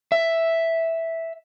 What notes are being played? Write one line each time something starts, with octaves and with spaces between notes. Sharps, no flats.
E5